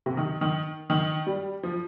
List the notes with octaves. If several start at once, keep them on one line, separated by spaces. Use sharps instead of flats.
C3
D#3
D#3
D#3
G3
F3